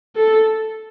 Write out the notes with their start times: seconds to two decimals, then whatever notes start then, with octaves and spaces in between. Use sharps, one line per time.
0.16 A4